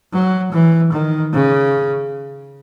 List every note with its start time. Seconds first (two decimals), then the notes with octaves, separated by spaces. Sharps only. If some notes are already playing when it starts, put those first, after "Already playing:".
0.13 F#3
0.53 E3
0.92 D#3
1.33 C#3